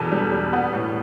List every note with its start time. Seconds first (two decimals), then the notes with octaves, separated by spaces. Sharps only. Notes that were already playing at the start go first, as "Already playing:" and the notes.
Already playing: E2 B2 A4
0.12 G3
0.32 G3
0.53 B3
0.73 A2